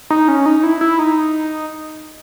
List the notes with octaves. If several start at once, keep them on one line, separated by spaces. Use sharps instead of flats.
D#4
C#4
D#4
E4
E4
D#4